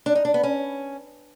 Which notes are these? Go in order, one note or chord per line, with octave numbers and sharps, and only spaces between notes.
D4
D#4
D4
B3
C#4